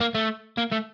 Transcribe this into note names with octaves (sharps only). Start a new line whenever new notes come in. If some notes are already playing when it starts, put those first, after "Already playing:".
A#3
A3
A#3
A3